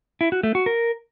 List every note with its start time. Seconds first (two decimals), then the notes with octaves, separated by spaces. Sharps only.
0.21 E4
0.32 F#4
0.43 A3
0.55 F#4
0.66 A#4